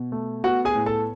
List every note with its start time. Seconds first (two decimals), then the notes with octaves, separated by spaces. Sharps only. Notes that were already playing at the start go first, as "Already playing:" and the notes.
Already playing: B2
0.12 A3
0.44 B3 F#4 F#5
0.65 G#4 G#5
0.75 A2
0.86 A4 A5